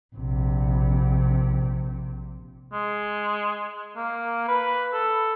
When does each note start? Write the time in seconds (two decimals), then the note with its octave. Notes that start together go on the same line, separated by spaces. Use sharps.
0.16 A#1 C3
2.73 G#3
3.96 A#3
4.48 B4
4.94 A4